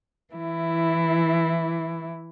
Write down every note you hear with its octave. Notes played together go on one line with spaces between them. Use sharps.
E3 E4